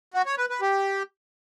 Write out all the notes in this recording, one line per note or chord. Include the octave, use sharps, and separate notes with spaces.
F#4
C#5
B4
B4
G4